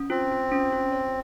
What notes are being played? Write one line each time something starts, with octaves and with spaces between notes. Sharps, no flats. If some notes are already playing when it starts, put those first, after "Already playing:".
Already playing: C#4
C4 F4
F4
C#4
F4
C#5